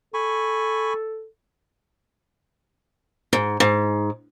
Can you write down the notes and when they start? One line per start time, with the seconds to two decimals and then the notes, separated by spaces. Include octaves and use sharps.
0.14 A4 G#5 B5 C#6
3.33 G#2
3.60 G#2